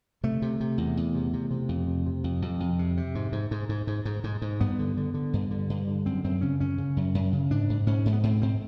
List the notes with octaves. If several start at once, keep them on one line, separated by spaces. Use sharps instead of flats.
C3 A3
C3
C3
E2
E2
C3
C3
C3
F2
C3
C3
F2
F2
F2
C3
C3
G#2
G#2
G#2
G#2
G#2
G#2
G#2
G#2
G2 B3
D3
D3
D3
G2
D3
G2
D3
F#2 C4
F#2 C4
C#3 C#4
F#2 C#4
C#3
F#2
F#2
C#3
G#2 D4
G#2
G#2 C#4
G#2
B3
G#2 C4
G#2 C4